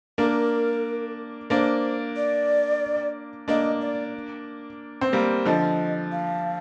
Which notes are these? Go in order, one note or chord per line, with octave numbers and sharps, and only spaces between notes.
A#3 D4 A#4
A#3 D4 C5
D5
A#3 D4 D#5
D5
C4
G3 A#3
D3 F3 D#5
F5